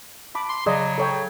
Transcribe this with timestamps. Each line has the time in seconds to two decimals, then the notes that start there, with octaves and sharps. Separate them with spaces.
0.35 A5 B5 D6
0.49 C6
0.66 C#3 F#3 G#4 D5 D#5
0.98 A4 C#5 G5